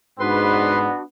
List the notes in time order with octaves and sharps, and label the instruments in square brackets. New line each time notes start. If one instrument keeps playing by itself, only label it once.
[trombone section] G#2 [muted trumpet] B3 [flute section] D4 F#4 [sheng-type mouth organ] B4 C6